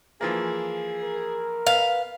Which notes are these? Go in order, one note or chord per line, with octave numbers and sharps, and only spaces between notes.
E3 F3 A#3 G#4
A#4
B3 F5